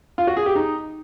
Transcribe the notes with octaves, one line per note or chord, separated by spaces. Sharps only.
F4
F#4
G#4
G4
D#4